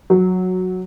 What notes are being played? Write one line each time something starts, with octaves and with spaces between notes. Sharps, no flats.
F#3